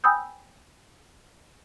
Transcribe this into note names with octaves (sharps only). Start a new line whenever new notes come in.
G5 G#5 B5 D#6 E6 G6